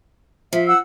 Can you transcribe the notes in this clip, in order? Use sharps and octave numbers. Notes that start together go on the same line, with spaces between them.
F3 E5
F#5 E6